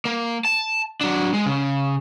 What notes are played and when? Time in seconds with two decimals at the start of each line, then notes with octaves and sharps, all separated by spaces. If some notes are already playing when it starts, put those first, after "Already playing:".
0.05 A#3
0.45 A5
1.01 F#3 D4
1.33 G#3
1.46 C#3